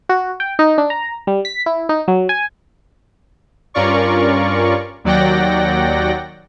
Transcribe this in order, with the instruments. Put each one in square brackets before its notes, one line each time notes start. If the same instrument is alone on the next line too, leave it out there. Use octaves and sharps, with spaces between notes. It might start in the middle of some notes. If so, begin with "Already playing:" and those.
[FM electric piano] F#4
G5
D#4
D4
A#5
G3
B6
E4
D#4
F#3
G#5
[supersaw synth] G2 C#4 F4 A#4 D5 C#6
D#2 F#3 D5 F#5 G5 A#6